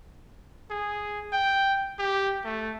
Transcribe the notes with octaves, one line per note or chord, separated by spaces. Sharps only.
G#4
G5
G4
A3